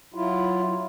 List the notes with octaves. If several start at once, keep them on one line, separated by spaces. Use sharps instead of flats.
F#3 E4 F4